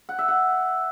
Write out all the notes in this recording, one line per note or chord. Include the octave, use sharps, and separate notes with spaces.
F#5
E5
F#5